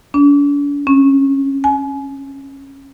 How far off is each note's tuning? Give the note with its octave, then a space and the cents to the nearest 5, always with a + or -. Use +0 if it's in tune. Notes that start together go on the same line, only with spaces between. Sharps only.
D4 -45
C#4 -20
G#5 +30